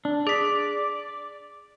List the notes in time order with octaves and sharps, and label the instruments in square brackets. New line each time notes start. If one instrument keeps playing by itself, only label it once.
[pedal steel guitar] D4
[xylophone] G#4 B6 [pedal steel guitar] D5